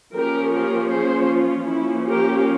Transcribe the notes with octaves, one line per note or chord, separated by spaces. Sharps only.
F3 A#3 C#4 G4 A#4
G4 A#4
G#4 C5
F4
F3 A#3 C#4 E4
G4 A#4